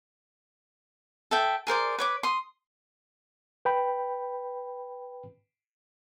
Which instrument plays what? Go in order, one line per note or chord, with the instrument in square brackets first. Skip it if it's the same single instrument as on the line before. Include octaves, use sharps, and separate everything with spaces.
[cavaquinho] A4 E5 G5
G#4 A#4 C5 D5
B4 C#5 D6
C6 D#6
[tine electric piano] B4 G5 B5